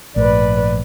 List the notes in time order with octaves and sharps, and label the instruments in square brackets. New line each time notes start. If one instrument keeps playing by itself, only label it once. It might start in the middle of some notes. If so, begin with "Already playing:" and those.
[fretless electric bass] A#1 G#2 A3 [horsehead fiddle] B4 D5